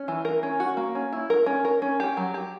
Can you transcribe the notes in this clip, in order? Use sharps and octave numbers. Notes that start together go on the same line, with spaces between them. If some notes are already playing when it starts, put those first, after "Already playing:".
Already playing: C#4
E3
A#4
C#4
F#4
A#3
C#4
E4
A#4
C#4
A#4
C#4
G4
F#3
G4